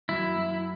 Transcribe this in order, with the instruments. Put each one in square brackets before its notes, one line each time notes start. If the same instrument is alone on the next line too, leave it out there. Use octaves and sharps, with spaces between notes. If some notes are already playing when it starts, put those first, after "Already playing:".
[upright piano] F#2 [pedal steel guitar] E4
[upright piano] F#2